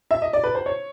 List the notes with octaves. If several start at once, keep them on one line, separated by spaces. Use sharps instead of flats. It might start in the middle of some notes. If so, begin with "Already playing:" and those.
E5
D#5
D5
B4
C5
C#5